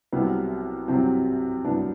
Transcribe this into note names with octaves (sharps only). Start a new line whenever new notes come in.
C2 C3 F#3 B3
C2 C3 F#3 C4
C2 C3 F#3 B3 D4